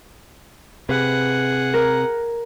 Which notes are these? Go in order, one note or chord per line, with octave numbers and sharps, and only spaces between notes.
C3 G#4 B4 F#5
A#4